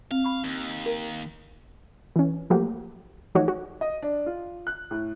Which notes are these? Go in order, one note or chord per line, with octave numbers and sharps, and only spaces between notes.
C4 F5
B5 C#6
D#2
A#4
E3 C#4
F3 F#3 A3 A#3 F#4 G4
E3 F3 A3 D#4 F#4 C#5
F#4
D#5
D4
F4
F#6
A2